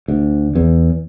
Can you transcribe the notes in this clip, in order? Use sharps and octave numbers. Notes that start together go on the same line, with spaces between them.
D2
E2